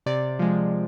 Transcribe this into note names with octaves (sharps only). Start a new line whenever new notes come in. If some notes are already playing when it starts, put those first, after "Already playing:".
C3 D5
F3 G#3